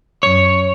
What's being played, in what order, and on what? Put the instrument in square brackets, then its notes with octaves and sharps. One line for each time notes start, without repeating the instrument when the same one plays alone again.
[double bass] F#2 [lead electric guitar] C#5